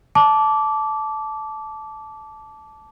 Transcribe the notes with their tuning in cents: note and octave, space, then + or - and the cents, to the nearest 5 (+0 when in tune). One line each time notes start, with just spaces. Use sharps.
A5 -15 D6 -15